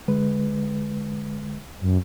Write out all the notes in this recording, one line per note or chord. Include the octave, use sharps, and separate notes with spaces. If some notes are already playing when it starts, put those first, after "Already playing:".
D3 G#3 B4
F#2